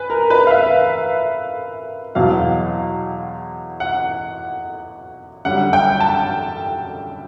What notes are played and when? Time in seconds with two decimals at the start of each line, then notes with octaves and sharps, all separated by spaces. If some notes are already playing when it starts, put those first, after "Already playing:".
Already playing: B4 G#5
0.10 A#4
0.30 B4
0.47 F5
0.51 E5
2.15 E2 B2 F#3 F5
3.80 F#5
5.45 F#2 D3 G3 F#5
5.73 G5
6.00 A5